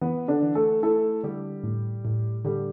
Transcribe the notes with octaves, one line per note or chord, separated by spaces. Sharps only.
E3 B3
D3 D4
E3
A3 A4
A3 E4 A4
D3 G3 G4
A2
A2
D3 G3 G4